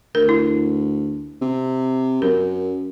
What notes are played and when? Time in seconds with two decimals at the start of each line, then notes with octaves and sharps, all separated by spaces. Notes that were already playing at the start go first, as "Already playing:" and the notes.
0.15 D2 A#4
0.29 E4
1.41 C3
2.22 F#2 A#4